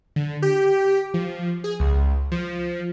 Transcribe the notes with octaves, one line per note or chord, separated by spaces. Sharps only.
D3
G4
F3
G#4
C#2
F3